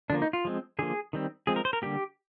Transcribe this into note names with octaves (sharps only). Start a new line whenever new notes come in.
D3 F3 A#3 D4
D#4
F4
F3 G#3 C4
D3 F3 A#3 G#4
D#3 G3 C4
F3 G#3 C4 G#4
A#4
C5
A#4
D3 G3 A#3 G4